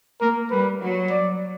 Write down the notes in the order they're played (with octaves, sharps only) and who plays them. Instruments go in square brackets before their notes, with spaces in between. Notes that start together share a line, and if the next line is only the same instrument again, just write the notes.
[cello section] A#3 [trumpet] A#4
[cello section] G3 [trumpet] B4
[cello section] F#3
[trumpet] D5